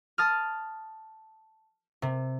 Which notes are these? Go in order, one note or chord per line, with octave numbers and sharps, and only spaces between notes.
A5 D#6 F6
C3